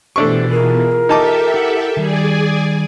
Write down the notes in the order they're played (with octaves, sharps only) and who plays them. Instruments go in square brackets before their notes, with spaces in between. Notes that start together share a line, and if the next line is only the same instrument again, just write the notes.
[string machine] B2 E3 [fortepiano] A3 D4 C#6 [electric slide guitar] G4 C5
[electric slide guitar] F4 G#4 [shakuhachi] A#4
[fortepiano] D#4 A5 D6 [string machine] G4 A4 E5
[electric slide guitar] E4 F#5
[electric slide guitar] D#3 G3 [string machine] G#4 D5 G#5